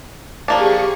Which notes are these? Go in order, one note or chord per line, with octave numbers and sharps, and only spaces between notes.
F3 A#3 D4 G4 G#4 C#6